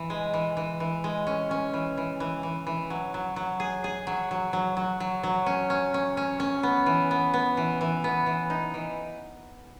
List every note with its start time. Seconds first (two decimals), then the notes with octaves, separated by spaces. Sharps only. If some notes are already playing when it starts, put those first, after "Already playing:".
Already playing: E3
0.10 G#3
0.34 E3
0.57 E3
0.80 E3
1.04 G#3
1.27 C#4
1.51 C#4
1.74 E3
1.98 E3
2.20 E3
2.43 E3
2.67 E3
2.90 F#3
3.14 F#3
3.36 F#3
3.60 G#4
3.84 G#4
4.07 F#3
4.31 F#3
4.53 F#3
4.77 F#3
5.00 F#3
5.23 F#3
5.46 C#4
5.70 C#4
5.94 C#4
6.17 C#4
6.40 C#4
6.63 B3
6.86 E3
7.11 B3
7.34 B3
7.57 E3
7.81 E3
8.04 B3
8.26 E3
8.50 D#4
8.74 E3